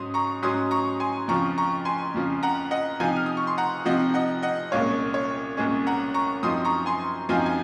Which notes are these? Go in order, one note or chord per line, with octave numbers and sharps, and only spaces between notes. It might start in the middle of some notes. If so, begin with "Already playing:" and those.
Already playing: G#2 F#3 C#4 C6 D#6
A#5 C#6
G#2 F#3 C#4 C6 D#6
A#5 C#6
G#5 C6
F2 C#3 F3 A#5 C#6
A#5 C#6
G#5 C6
F2 C#3 F3
F#5 A#5
D#5 F#5
C3 F3 C4 D#4 F5 G#5
F6
D#6
C#6
C6
F#5 A#5
C3 F3 C4 D#4 D#5 F#5
D#5 F#5
D#5 F#5
C2 A#2 G#3 C#4 C#5 F5
C#5
C2 A#2 G#3 C#4
F#5 A#5
A#5 C#6
F#2 F3 C4 D#4 C6 D#6
A#5 C#6
G#5 C6
F#2 F3 C4 D#4 F5 G#5
G#5